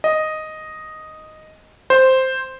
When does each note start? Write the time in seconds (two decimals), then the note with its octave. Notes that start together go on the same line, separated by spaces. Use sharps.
0.04 D#5
1.90 C5